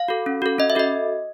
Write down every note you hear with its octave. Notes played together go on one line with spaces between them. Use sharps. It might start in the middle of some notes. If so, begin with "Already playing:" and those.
Already playing: F5
F#4 A4
C#4
F#4 A4
C#4 D#5
E5
F#4 A4 D#5